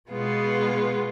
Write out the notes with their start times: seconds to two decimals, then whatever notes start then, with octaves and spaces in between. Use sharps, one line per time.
0.10 B2 G#3 B3 F4